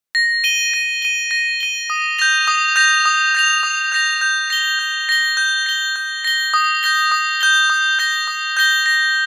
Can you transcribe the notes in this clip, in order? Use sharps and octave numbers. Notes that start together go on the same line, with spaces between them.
A#6
D#7 G7
A#6
D#7 G7
A#6
D#7 G7
D#6
G6 A#6 F7
D#6
G6 A#6 F7
D#6
G6 A#6 F7
D#6
G6 A#6 F7
G6
A#6 G7
G6
A#6 G7
G6
A#6 G7
G6
A#6 G7
D#6
G6 A#6 G7
D#6
G6 A#6 G7
D#6
G6 A#6 G7
D#6
G6 A#6 G7
A#6